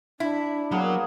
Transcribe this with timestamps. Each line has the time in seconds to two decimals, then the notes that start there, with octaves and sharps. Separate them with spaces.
0.20 D4 E4
0.71 F#3 A#3 B3 G#4